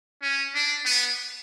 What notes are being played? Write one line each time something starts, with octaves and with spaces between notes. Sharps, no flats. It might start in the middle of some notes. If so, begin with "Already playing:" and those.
C#4
D4
B3